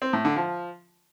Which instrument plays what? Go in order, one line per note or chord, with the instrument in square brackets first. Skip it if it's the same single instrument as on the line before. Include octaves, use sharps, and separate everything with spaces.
[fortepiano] C4
A2
D3
F3